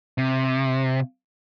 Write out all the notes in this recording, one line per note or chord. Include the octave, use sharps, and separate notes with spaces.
C3